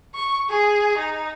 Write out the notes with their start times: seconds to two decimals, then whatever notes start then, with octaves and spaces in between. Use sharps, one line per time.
0.15 C#6
0.49 G#4
0.98 D#4